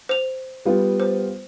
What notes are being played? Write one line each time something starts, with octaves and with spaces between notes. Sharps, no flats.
C5 F7
G3 B3 F4
C5